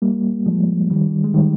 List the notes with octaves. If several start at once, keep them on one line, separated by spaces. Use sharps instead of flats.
G3 A#3
F3 G#3
D#3 G3
G#3
D#3 G3